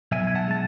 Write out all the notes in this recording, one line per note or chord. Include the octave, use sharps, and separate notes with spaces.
B1 E5 G#5
G#5
F#5 A5
G#3 A5